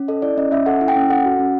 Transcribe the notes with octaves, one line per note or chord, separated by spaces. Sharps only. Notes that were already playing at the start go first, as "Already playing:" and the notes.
Already playing: C#4
A4 D#5
E4 D5
C#4 D#5
C#4 E5
A4 F#5
E4
G5
C#4
A4 F#5
F#4
C#4